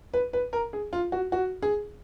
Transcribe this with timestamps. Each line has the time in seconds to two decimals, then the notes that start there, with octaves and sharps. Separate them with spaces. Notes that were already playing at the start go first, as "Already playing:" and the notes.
0.14 B4
0.33 B4
0.53 A#4
0.73 G#4
0.93 F4
1.12 F#4
1.32 F#4
1.62 G#4